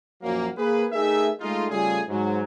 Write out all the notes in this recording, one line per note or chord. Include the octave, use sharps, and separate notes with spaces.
F#2 A#2 F3 F#3 A#3
A#3 G#4 B4
A3 D#4 G#4 A#4 E5
G#3 A3 D#4 F4
C#3 G3 A3 F4 G#4
G#2 F#3